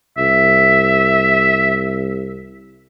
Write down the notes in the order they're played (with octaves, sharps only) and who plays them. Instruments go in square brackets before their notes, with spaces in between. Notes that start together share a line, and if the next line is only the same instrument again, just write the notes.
[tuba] C2 [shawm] E5